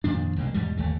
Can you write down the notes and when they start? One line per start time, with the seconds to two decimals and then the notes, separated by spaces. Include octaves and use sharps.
0.04 F2 A#2 D#3 D4
0.36 C2 B2 G#3
0.54 E2 G#2 B2 G3
0.77 G1 D#2 A3